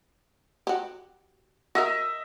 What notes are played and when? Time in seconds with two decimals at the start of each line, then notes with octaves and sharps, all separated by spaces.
0.67 F#4 G4
1.75 F#4 A#4 D#5 E5